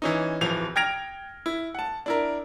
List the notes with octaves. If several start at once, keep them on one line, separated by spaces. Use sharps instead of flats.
E3 C#4 D#4
D1 E3 F3 F7
G5 F6 G#6 A#6 D7 F7
E4
F#5 A5
D4 E4 A#4